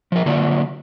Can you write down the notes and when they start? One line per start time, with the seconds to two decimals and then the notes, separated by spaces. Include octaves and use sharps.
0.12 F3 A#4
0.26 D3 F#3 A#3 F4 D5